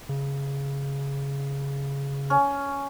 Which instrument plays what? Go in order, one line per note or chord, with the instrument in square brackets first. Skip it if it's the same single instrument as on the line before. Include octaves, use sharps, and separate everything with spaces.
[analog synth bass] C#3
[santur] C#4